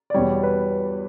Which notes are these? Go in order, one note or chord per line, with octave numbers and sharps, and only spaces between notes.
D5
E2 B2 G3 C#5
B4